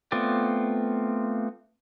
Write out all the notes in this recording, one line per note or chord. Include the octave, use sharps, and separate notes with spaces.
A3 B3 C4 F4 D5